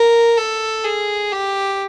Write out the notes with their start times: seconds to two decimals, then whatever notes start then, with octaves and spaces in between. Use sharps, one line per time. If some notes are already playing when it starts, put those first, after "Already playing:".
Already playing: A#4
0.37 A4
0.84 G#4
1.32 G4